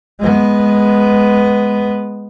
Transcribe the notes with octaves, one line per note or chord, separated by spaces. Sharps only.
G#3 B3